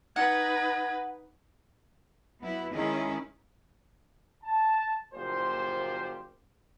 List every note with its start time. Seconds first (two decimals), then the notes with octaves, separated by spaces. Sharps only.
0.16 D#4 B4 F#5 G#6
2.41 F#3 B3 E4
2.73 D#3 G#3 C#4 E4 G#4 D#5
4.44 A5
5.14 F#1 A#2 F3 G4 C5